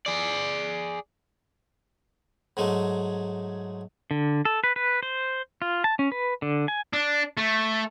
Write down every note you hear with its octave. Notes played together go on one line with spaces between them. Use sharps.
G#4 D5
G#2 F#3 G#3 A3
D3
A4
B4
B4
C5
F4
A5
C#4
B4
D3
G#5
D4
A3